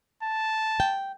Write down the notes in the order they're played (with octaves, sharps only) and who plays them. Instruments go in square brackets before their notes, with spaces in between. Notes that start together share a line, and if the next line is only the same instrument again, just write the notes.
[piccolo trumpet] A5
[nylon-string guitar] G5